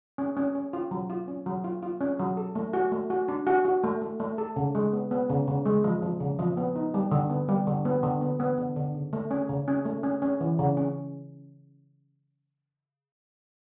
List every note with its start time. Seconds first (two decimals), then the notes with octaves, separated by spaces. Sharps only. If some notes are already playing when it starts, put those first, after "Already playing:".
0.18 C#4
0.37 C#4
0.55 C#4
0.73 F4
0.91 F#3
1.10 F4
1.28 C#4
1.46 F#3
1.64 F4
1.83 F4
2.01 C#4
2.19 F#3
2.37 A4
2.55 A3
2.73 F#4
2.92 A3
3.10 F#4
3.28 D4
3.47 F#4
3.65 F#4
3.84 A3
4.02 A3
4.20 A3
4.38 A4
4.56 C#3
4.75 G#3
4.93 B3
5.11 B3
5.30 C#3
5.47 C#3
5.66 G#3
5.84 F3
6.03 F3
6.20 C#3
6.39 F3
6.57 B3
6.75 D#4
6.94 G3
7.11 D3
7.30 B3
7.49 G3
7.67 D3
7.85 B3
8.03 D3
8.21 B3
8.40 B3
8.58 D3
8.76 D3
8.95 C#3
9.13 A3
9.31 C#4
9.49 C#3
9.68 C#4
9.85 A3
10.04 C#4
10.22 C#4
10.41 E3
10.59 C#3
10.77 C#4